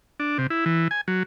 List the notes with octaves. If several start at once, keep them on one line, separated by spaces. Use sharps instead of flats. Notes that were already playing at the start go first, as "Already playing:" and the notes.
D4
C3
E4
E3
G#5
F#3